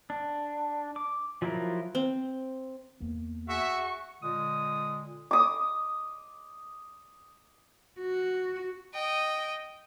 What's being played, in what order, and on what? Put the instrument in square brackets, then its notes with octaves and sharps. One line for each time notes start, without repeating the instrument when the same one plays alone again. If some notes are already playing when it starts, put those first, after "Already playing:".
[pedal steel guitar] D4
D6
F3 F#3 E4 F4 A#4
[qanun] C4
[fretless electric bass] E2 A#3 B3
[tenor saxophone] F#4 [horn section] G#4 E5 [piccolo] C#6
[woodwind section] A#2 D3 G#3 D#6
[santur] D6 D#6
[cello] F#4
[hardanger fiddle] D#5 G5